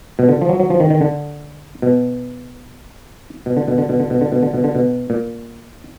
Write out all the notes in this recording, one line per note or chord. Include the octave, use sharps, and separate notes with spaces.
B2
D3
F3
F#3
F#3
F3
D#3
D#3
D3
B2
B2
D3
B2
D3
B2
D3
B2
D3
B2
D3
B2
D3
B2
A#2